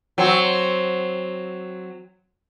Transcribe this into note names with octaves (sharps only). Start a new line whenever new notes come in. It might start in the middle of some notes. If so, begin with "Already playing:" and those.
F#3 C4